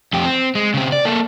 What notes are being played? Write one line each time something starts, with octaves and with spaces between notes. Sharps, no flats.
F2 G4
C4
G#3
C#3 C4
D5
A#3 A4